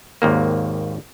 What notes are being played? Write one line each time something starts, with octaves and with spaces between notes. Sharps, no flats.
G#1 D#2 A#3